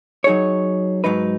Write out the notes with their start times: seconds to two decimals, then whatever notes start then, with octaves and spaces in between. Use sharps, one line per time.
0.24 F#3 D#4 G#4 C#5
1.04 G#2 F#3 D#4 B4